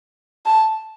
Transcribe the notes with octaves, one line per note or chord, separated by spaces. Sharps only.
A5